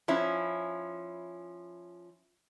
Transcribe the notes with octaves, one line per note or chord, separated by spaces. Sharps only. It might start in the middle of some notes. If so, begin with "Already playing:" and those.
F3 C#4 E4